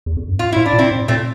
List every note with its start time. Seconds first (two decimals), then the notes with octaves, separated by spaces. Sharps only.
0.06 E2
0.17 F2
0.28 G2
0.39 A2 F4
0.52 A2 E4
0.66 D4
0.73 A#2
0.78 C4 E4
0.91 A2
1.08 A#2 A3 C4